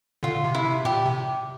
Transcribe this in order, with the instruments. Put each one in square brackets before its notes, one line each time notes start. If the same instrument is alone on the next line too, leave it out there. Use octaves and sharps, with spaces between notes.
[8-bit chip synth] A#2 D3 [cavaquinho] F4
[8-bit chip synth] C3
[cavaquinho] E4
[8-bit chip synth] C3
[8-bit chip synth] A#2 [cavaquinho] G4
[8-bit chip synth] C3